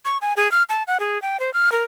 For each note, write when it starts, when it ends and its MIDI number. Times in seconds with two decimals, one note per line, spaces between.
0.05 0.18 85
0.22 0.33 80
0.37 0.50 68
0.52 0.63 89
0.69 0.83 81
0.87 0.98 78
1.00 1.20 68
1.22 1.40 79
1.40 1.53 72
1.54 1.72 89
1.72 1.83 70